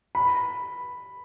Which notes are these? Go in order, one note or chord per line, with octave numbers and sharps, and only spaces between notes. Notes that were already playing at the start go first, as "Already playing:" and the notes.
B5